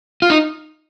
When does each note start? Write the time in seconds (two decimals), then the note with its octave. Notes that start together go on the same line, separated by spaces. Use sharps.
0.22 F4
0.30 D#4